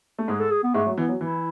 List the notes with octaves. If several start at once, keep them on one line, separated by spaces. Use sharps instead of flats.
A3
G#2 G#3 G#4
A4
G#4
B3
G#2 G#3 A3
F#3
E3 B3
F#3
E3 E4